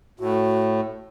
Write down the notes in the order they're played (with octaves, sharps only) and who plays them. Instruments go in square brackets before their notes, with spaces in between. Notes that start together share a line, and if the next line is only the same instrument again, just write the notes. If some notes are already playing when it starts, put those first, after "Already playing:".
[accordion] A2 [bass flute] F#4